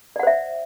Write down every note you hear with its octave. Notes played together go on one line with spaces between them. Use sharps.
C5 D5 E5 F#5